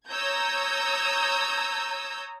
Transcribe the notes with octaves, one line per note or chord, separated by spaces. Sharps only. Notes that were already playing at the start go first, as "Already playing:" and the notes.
C#5 A#5 D#6 E6 G6 G#6